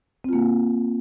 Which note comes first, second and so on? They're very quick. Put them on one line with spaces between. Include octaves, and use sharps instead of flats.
C4 F4 A#3